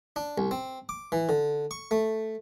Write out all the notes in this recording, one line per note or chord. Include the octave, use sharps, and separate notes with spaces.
D4
C2
C4
D6
E3
D3
C#6
A3